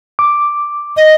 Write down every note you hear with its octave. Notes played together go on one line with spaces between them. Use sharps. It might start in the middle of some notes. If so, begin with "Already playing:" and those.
D6
D#5